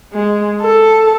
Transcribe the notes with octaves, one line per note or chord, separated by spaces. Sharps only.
G#3
A4